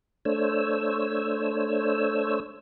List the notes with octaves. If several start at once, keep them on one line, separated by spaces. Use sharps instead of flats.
A3 D4 C5 C#5 E6